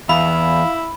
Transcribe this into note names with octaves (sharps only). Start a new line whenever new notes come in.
E2 E4 F5 B5